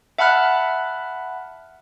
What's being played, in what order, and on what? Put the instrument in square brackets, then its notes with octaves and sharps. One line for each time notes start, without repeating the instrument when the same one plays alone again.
[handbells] E5 F#5 A5 B5 F6 F#6